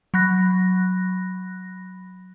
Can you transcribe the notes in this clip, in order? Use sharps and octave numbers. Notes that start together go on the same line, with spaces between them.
F#3 B5 F#6 A#6